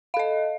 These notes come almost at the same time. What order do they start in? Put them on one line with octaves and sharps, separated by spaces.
F5 A4 D#5